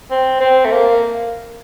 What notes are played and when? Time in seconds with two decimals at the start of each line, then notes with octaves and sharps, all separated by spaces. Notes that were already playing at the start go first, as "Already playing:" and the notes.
0.11 C4
0.40 C4
0.64 A3
0.71 A#3